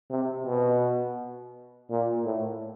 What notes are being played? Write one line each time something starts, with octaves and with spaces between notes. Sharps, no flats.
C3
B2
A#2
A2